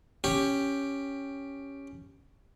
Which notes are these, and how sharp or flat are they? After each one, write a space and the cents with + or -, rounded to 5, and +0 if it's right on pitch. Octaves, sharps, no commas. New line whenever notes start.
C#4 +0 G4 +5